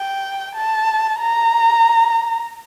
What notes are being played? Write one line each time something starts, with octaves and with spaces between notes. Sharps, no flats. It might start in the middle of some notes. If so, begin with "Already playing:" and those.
Already playing: G5
A5
A#5